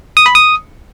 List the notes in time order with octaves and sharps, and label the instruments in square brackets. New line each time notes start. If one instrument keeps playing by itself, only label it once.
[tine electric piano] D#6
B5
D#6